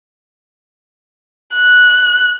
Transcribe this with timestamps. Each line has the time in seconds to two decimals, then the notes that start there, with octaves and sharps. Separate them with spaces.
1.55 F#6